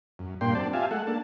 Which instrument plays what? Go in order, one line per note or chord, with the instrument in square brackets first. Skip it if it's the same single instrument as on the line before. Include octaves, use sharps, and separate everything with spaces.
[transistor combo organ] F#2
G2 A#2 A#3 D4 G5 C6
F#3 C4 D4 D5 A5
F4 G4 E5 F5 G#5 A5
G#3 A3 A4 F#5
A#3 D4 A5